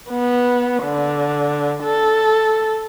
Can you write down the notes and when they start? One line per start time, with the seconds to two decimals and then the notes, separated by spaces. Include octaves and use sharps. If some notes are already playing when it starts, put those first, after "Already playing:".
0.10 B3
0.84 D3
1.83 A4